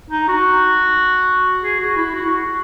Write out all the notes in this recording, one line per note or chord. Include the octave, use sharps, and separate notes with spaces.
D#4
F#4
G#4
F#4
E4
F#4
F#4